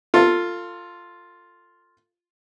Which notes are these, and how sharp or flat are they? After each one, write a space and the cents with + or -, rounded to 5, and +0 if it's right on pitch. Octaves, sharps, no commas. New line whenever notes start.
F4 +0 A4 +30